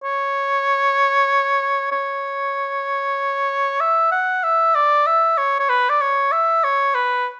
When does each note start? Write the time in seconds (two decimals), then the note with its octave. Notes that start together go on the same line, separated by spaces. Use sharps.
0.04 C#5
1.92 C#5
3.81 E5
4.12 F#5
4.44 E5
4.75 D5
5.07 E5
5.38 C#5
5.59 C#5
5.69 B4
5.89 D5
6.01 C#5
6.32 E5
6.64 C#5
6.95 B4